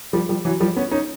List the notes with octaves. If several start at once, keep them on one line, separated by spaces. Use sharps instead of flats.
F3 G3
F3 G3
E3 F#3
F3 G3
B3 C#4
C#4 D#4